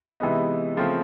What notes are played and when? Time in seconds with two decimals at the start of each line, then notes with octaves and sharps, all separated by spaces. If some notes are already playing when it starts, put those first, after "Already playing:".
0.20 C3 E3 G#3 B3 D#4
0.77 C#3 F3 A3 C4